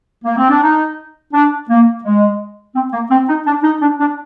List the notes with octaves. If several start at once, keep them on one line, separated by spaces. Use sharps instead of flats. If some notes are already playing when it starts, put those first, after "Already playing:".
A#3
C4
D4
D#4
D4
A#3
G#3
C4
A#3
C4
D#4
D4
D#4
D4
D4